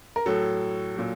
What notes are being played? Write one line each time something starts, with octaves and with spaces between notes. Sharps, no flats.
A#4
A2 F#3 A4
A#2 F#3